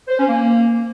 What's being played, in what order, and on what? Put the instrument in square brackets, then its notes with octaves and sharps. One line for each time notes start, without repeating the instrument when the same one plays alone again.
[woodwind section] C5
C#4
A#3